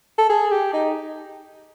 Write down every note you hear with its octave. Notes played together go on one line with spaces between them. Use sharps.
A4
G#4
G4
D#4